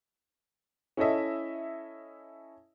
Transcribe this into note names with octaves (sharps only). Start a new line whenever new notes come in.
C#4 E4 A4 D#5 E5